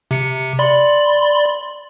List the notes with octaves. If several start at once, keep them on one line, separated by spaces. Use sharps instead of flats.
C3 C#7
D5 B5 C6